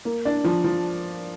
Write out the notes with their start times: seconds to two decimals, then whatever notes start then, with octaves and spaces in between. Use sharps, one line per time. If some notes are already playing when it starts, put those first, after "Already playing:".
0.05 A#3
0.25 D4
0.44 F3
0.64 F3